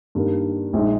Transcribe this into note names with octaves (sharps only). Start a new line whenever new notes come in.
G2 D#3 A#3
A#1 A#2 G#3 D#4